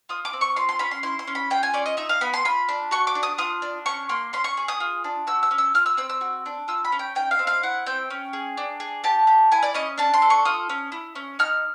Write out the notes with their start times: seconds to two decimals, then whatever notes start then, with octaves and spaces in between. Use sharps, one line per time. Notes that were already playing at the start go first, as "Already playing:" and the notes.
0.09 F4 D#6
0.25 D6
0.33 C4
0.41 C#6
0.56 F4 C6
0.69 C6
0.79 C#4 B5
0.91 C6
1.03 E4 C6
1.19 C6
1.27 C#4
1.35 B5
1.50 F4 G5
1.63 G#5
1.74 C#4 D5
1.86 D#5
1.97 D#4 E5
2.09 F5
2.21 B3 B5
2.34 C6
2.45 F4 B5
2.69 D4
2.91 F#4 C#6
3.07 D6
3.15 D4
3.23 D#6
3.38 F4 D#6
3.62 D4
3.86 C#4 C#6
4.09 A#3 C6
4.33 C#4 C6
4.44 C#6
4.57 G#4
4.68 D#6
4.80 F4
5.04 D4
5.27 F#4 E6
5.43 E6
5.51 C#4
5.58 E6
5.74 F4 F6
5.86 E6
5.97 C4 E6
6.10 E6
6.21 F#4
6.46 D4
6.68 F4 E6
6.85 B5
6.92 C#4
6.99 G5
7.15 D#4 G5
7.31 F5
7.39 C4
7.47 F5
7.63 E4 F#5
7.87 C4 G5
8.10 C#4
8.33 G#4
8.57 D4
8.80 G#4
9.04 G4 A5
9.27 G4
9.52 E4 G#5
9.63 D5
9.74 C#4 D#5
9.98 D4 A5
10.14 C6
10.22 A4
10.30 C#6
10.45 F4 D#6
10.69 C#4
10.92 E4
11.15 C#4
11.39 D#4 F6